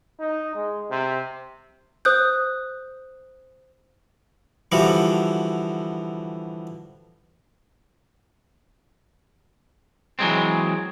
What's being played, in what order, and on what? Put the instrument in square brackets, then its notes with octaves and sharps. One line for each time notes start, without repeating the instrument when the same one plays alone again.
[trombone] D#4
G#3
C3
[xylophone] C5 D#6 F#6 G6
[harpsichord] D3 E3 F3 G3 F#4
[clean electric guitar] E3 F#3 G#3 C4